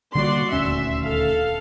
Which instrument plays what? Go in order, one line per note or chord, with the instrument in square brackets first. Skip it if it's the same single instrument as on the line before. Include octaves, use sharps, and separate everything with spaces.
[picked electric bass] D3 G3 A#3 [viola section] F#4 D5 C6
[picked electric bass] D#1 D2 C#4 [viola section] E5
[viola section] A4 F5